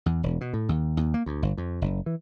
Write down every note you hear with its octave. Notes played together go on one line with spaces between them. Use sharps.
E2
E1
B2
A2
D#2
D#2
A#3
D2
G1
F2
F#1
E3